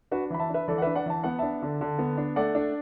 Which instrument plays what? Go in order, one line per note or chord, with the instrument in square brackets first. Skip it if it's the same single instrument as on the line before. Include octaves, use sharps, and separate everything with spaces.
[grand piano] D4 F#4 B4
E3 B5
E5 A5
D4 B4 E5
E3 A4 D5
F#5
D4 B4 E5
D5 F#5
E3 A5
B3 F#5
D4 E5 A5
D3
D3
B3
D4
A3 D5 F#5
D4